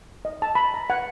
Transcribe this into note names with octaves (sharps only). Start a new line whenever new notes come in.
D#5
A5
B5
A#5
F#5